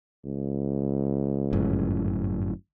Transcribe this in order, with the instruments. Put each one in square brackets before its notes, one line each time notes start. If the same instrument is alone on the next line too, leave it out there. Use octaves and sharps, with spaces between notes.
[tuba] C#2
[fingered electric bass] G1 F#2 A2